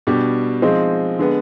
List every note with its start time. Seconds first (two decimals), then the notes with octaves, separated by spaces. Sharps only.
0.07 B2 G3 D4 G4
0.62 F3 G#3 C4 D#4
1.19 D3 G#3 B3